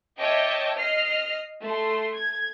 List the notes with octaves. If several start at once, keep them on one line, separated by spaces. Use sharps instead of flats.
C#5 D#5 E5 G5 A5 D6
D#5 F6 C7
A3 C6
G#6